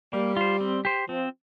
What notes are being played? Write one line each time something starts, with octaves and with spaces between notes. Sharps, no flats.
G3 A#3
F4 C5
C4
G4 C5
F3 C4